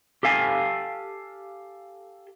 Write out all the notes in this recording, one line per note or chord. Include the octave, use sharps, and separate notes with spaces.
G4 A4 F5 G#5